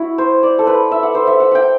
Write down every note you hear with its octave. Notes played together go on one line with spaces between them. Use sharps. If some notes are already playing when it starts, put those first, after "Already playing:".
Already playing: E4 F#4
C5
D5
A4
B4
E5
F#5
C5
E5
F#5
F#5 G5